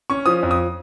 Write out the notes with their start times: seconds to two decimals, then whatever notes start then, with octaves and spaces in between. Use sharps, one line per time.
0.10 C#4 C#6
0.26 F3 D#6
0.43 F2
0.51 D#6